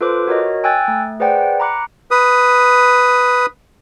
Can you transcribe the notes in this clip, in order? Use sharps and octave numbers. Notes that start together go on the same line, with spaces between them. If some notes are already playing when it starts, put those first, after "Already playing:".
F4 A4 B4 C5 D6
F#4 A#4 C#5 D#5
G5 G#5 E6 F#6 G#6 A6
A3
G#4 B4 C5 D5 F#5 G5
A#5 B5 D6 F#6 C#7
B4 D#6